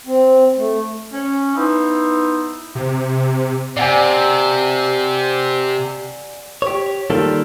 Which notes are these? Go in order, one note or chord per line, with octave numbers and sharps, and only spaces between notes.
C4
A3
C#4
B3 D#4 E4 C5 D#5 E5
C3
C3 D5 F#5 G#5
G4 C#5
D#3 G3 A#3 F4 A4